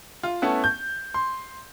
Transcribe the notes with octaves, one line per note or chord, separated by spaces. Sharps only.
F4
A3 B3 C#4 E4 F#5 A5
G6
C6